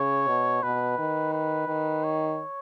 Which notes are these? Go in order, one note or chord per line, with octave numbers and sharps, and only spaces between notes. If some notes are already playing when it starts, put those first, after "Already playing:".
Already playing: C#3 C#5
B2
B2 B4
D#3
B4
D#3
C#5